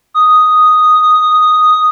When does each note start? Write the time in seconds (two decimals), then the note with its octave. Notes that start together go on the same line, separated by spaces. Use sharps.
0.14 D#6